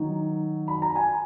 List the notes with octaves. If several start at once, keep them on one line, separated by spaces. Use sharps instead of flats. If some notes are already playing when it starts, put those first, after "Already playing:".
Already playing: D#3 F#3 D#4
B5
A#5
G#5